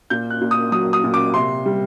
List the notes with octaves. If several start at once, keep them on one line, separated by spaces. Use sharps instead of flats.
A#2 G6
F#6
A#2
D#6
F#3 D#6
D#6
A#2
D6
C3 C6
G3